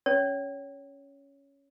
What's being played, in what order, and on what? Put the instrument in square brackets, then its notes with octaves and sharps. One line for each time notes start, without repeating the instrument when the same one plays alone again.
[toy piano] C#4 C#5